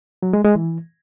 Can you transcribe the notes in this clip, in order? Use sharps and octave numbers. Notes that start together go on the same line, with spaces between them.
F#3
G#3
G#3
E3